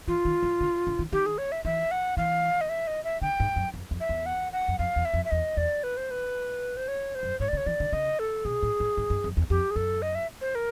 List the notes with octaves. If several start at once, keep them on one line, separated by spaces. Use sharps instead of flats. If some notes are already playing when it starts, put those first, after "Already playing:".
E3 F4
D#3
E3
D3
D3
D#3
D#3 G4
G#4
C#5
E5
E3 E5
F#5
E3 F5
D#5
E5
D#5
E5
D3 G5
G#2
F#2
F2
F2
E5
E2
F#5
F#5
F#2
F2 F5
E2
E5
F2
E5
E2 D#5
E2 D5
B4
C5
B4
C5
C#5
C5
F#2
G#2 C#5
D5
C#3
C#5
E3 D5
D3
C#3 D#5
A4
B2 G#4
A2
A2
G#2
G2
F2
E2
F2 G4
G#4
F#2 A4
D#5
E5
C5
A#4